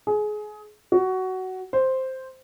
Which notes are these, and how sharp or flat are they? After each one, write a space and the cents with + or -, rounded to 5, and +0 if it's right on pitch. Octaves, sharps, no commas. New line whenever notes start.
G#4 +25
F#4 +15
C5 +0